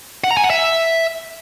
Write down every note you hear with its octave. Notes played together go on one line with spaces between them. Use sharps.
F#5
A#5
G#5
F#5
E5